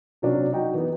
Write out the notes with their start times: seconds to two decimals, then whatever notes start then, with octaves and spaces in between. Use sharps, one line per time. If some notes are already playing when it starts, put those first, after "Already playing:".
0.22 C3 F#3 C#4 D4
0.52 F#3 D#4 F#4 G5
0.74 E3 B3